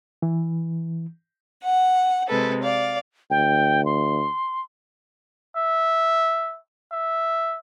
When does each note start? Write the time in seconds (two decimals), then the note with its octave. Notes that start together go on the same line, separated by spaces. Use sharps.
0.22 E3
1.62 F#5
2.28 C3 G#3 A4 B4
2.63 D5 F5
3.30 D2 G5
3.85 C6
5.56 E5
6.92 E5